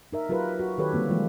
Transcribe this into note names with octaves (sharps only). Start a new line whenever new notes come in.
D#4 A#4 E5
F#3 F4 G4 A#4 B4
F#4
D#3 G4 A4 B4 C#5
D3 G3 A#3 C4
E3 F3 G#3 A#3 F4